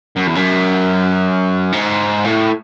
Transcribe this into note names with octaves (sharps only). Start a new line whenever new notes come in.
F#2
E2
F#2
G#2
A2